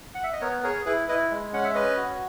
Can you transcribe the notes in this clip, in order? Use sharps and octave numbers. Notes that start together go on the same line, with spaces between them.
F#5
E5
D#5
B3 A#4 C#5
G#4 A#4 C#5
E4 G#4 B4
E4 B4 D#5
G#3
C#4 F#5
E5
C#4 B4 D#5
F#4